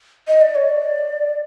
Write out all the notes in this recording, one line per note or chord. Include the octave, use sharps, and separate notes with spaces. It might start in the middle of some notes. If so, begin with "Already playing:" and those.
D#5
D5
C#5
D5